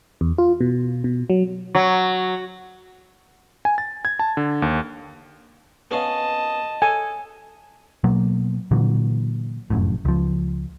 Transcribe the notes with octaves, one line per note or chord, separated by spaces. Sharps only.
E2
F4
B2
B2
F#3
F#3
G#5
A6
G#6
A5
D3
D#2
B3 C#4 D#5 F5 A5
A4 G#5
B2 F#3 A#3
A#2 D3 E3 F#3
F1 F#2 A2
C#2 F3